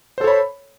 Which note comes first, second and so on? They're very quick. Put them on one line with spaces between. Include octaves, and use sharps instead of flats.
C5 A4 C#5 B5